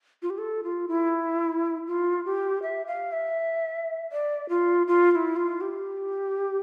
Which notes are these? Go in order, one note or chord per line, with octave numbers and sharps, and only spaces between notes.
F4
G4
A4
F4
E4
F4
G4
E5
F5
E5
D5
F4
F4
F4
E4
F4
G4